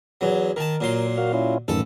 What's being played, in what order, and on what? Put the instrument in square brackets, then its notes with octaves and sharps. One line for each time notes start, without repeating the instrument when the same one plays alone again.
[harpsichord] E2 F#3
[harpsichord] D#3 A5 [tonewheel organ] A#4
[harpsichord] A#2 F#3 C6
[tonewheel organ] A#3 F#4 F5
C#4 E4 F4
[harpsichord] A1 A4 [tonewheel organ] F#2 D#3